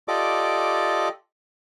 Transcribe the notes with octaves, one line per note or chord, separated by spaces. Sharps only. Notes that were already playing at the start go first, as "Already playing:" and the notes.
F4 G4 A4 D5 D#5 D6